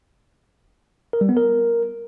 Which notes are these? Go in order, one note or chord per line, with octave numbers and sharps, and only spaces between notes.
A#4
G3
B3
A#4